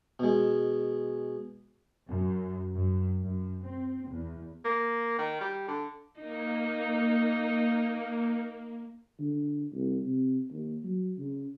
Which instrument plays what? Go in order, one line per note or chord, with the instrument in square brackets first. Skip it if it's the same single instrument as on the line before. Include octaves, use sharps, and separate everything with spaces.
[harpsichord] B2 G#3
[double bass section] F#2
F#2
F#2
C4
E2
[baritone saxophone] A#3
D#3
G3
D3
[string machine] A#3 [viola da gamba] D#4
[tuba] D3
C2
C3
D#2
F#3
C#3